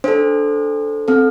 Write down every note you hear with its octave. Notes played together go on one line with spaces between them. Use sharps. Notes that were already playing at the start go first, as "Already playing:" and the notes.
D4 A4 C5
C4 A4